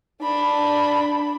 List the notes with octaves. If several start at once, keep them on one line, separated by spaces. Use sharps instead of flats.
D4 B5